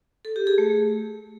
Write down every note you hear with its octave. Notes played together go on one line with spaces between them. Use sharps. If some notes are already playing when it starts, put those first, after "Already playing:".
A4
G4
G#4
A3